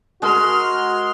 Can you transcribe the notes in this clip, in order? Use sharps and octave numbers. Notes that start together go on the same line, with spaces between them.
G#3 F#4 G#4 A#4 C6 F6